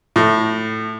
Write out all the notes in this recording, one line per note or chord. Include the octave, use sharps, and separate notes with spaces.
A2